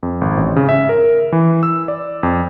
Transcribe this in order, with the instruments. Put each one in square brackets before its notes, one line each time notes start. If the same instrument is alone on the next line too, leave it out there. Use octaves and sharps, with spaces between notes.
[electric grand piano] F2
G#1
A1
C#3
E5
A#4
E3
E6
D5
F2